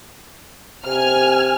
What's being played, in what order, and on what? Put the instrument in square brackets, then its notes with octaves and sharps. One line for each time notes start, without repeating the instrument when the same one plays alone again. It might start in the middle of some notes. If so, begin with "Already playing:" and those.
[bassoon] C3 [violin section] G#5 F6